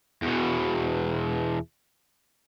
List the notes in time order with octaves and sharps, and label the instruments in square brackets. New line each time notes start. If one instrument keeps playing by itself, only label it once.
[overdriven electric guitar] E2 B2